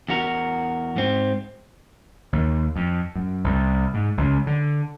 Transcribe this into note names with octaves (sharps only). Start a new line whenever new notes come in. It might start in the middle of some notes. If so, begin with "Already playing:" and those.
E2 F#4 A#4
G#2 C4
D#2
F2
F#2
C2
G#2
C#2
D3